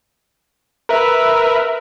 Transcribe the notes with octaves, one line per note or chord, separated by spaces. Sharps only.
A#4 B4 E5